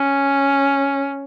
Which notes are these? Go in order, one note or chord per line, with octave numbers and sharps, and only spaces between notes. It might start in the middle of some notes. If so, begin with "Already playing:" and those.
Already playing: C#4